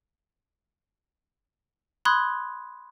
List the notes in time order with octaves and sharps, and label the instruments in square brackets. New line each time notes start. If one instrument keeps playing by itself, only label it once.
[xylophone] B5 C6 D#6 F#6 G#6